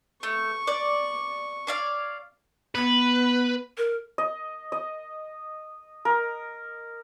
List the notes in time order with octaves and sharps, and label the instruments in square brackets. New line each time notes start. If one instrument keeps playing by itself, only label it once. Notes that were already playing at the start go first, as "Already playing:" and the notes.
[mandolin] A3 [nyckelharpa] C#6
[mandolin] D5
C#5 D5 F5
[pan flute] B3 [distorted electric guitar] B4
[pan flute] A#4
[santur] D#5
D#5
A#4